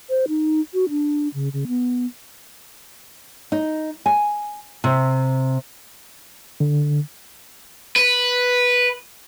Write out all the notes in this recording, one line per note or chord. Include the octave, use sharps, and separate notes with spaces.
C5
D#4
F#4
D4
C#3
C#3
B3
D#4
G#5
C3
D3
B4